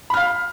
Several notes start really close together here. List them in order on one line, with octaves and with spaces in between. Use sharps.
B5 F6 F5